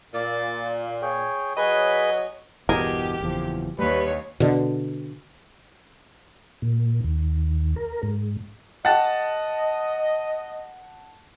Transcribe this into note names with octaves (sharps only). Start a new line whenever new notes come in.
A#2 D5
G#4 C#5 G5
F#3 G#4 B4 C#5 D#5 B5
G1 E2 B2 G4 G#4 A#4
F#1 E2 F3
D#2 G3 B4 C#5
B2 D3
A#2
D#2
A#4
G#2
G#4 D#5 F#5 G5 A5 A6